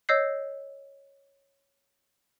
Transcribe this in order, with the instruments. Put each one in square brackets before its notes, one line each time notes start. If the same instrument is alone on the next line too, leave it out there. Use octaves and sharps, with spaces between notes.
[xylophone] C#5 D#5 E6 G6 C7